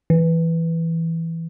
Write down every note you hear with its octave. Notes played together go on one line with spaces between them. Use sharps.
E3